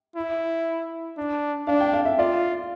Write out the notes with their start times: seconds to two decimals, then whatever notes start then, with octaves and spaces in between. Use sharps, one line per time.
0.16 E4
1.18 D4
1.67 D4 F5
1.81 G5
1.93 F5
2.05 E5
2.18 F4 D5